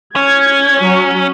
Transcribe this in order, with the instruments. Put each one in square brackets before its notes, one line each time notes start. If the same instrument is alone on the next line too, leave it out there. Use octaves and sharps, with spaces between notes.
[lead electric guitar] C#4 [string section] G#6
[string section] F#3